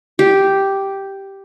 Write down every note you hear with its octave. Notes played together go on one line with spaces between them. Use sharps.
G4